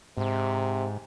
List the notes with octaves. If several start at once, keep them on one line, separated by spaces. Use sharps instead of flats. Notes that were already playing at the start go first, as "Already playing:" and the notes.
G#2 C3